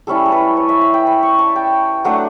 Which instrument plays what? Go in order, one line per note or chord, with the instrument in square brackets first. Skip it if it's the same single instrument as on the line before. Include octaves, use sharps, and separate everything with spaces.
[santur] G3 C#4 E4 A4
A4
B4
C#5
E5
B5
G5
B5
C#6
A5
G5
F#3 A3 D4 F#5